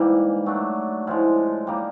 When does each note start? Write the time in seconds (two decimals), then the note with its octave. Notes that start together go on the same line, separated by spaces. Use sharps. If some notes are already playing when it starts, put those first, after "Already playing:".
Already playing: G#2 E3 G3 A#3
0.46 F#3 A3 D4
1.07 A2 F3 G#3
1.67 G3 A#3 D#4